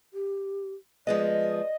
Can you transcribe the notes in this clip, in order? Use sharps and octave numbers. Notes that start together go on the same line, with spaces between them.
G4
F3 G#3 B3 D5 D#5